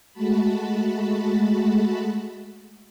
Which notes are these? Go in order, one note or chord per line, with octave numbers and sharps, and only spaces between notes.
G#3 A3 F#4 A5 B5